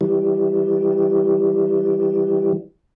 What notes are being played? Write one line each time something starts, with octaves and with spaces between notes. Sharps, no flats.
E3 G3